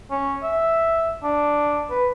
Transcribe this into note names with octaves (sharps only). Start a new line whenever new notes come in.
C#4
E5
D4
B4